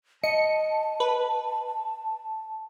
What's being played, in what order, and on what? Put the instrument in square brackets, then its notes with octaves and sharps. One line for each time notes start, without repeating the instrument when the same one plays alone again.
[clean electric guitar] D#5 [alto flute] A5 [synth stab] C#7
[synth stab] B4